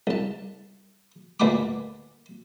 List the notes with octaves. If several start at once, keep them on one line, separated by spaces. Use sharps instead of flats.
C2 A5
D2 A#2 B4 F#5 G#5 D6